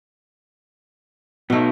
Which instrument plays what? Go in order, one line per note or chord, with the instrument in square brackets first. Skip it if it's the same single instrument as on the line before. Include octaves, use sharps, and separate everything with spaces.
[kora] B2 A3 [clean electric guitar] B3 D#4